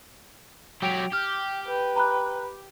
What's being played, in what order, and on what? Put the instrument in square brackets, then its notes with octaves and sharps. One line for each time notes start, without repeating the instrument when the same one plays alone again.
[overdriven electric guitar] F#3 G4 [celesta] G5 D7 F7
[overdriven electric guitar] G4 [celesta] F6 G6
[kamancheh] B4 G5
[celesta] A#5 B5 F#6